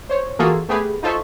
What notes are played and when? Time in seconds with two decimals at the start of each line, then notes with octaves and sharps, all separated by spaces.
0.09 C5 C#5
0.39 E3 A#3 F4 F#4 G#4 A4
0.69 A3 B3 G4 G#4 B4
1.03 D#4 F4 A4 C5 E5 C#6